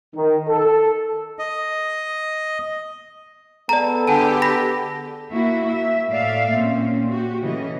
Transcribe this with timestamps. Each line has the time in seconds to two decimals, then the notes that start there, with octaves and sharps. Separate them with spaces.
0.15 D#3
0.49 A4
1.39 D#5
3.69 B3 G#4 A4 D5 A#5
4.07 D3 G4 F#5 G#5 A5
4.42 B5 A#6 B6
5.30 A#3 E4 F#4 E5
5.64 A#3 E5
6.09 A2 A3 D5 E5 F5
6.52 A#2 C4 C#4
7.09 F#4 G4
7.41 C#3 E3 A3 C#4 D#5